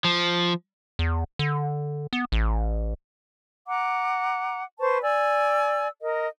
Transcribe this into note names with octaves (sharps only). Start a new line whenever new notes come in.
F3
E2
D3
B3
A1
F#5 A#5 D6
B4 C5 A5 C#6
D5 G#5 E6
A#4 D#5